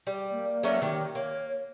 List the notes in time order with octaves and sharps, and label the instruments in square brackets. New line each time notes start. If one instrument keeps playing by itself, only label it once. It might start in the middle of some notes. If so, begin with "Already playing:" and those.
[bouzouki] G3
[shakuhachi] A#3
[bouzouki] F#3 A3 C#4
[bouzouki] D#3 [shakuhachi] G4
[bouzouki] A#3 [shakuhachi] C#5